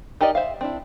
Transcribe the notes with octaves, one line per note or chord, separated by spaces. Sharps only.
D#4 G4 A#4 D5 D#5
C5 E5 F5
C4 D4 E4